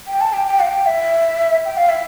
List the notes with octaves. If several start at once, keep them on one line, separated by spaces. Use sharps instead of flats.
G5
A5
G5
G5
F5
G5
E5
G5
F5
E5